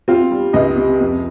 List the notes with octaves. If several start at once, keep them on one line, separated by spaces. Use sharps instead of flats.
C4 F4
G3
C#2 D#5
C3
F2